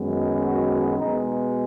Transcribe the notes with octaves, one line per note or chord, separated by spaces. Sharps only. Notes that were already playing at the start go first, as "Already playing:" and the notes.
Already playing: F#2 D#3 G#3 B3
F#4
B2 G#3 B3 D#4